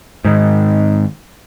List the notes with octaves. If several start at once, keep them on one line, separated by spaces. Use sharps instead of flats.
G#2 D#3